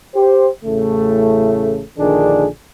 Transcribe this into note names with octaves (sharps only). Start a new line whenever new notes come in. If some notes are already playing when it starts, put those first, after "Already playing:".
G4 C5
A1 A2 C#3 A3
A#1 D3 D#3 D4 G#4